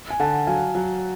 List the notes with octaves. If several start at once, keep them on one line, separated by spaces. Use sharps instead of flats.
G#5
D3 F#5 A5
F#3 F5 G#5
F#3